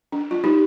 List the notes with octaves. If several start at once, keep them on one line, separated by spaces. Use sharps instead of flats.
D4
F4
D#4 G4